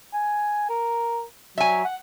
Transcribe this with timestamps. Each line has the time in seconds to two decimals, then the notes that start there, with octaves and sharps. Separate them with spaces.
0.13 G#5
0.69 A#4
1.58 F#3 E5 G#5
1.84 F#5